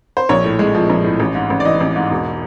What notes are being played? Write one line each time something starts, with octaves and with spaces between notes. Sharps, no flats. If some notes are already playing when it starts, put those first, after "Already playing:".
C5
A#1 C#5
A2
G#3
F3
A#1
A2
A1
G#2
A1
D5
E3 D#5
A1
G#2
E1